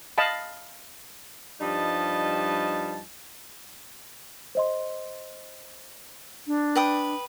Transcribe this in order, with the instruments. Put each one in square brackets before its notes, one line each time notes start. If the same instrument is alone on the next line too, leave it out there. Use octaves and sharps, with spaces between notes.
[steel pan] D#5 F5 A5 B5
[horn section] G2 F3 G3 D#4 D#5 A5
[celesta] C5 D#5 C6
[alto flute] D4
[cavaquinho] B4 G5 D#6